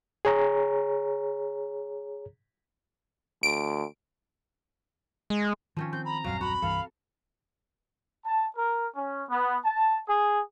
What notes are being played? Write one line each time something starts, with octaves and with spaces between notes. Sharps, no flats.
G#4 C#5 A#5
D2 D7
G#3
D#3 F3 C4 C#4
C4 G6
A#5 B5
D#1 A#1 F#2 F#3 G#3 F5
F#4 B5
C2 G2 E3 A4 F5
A5
A#4
C#4
B3
A5
G#4